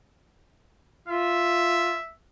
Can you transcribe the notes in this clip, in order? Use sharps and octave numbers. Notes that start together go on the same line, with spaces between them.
F4 E5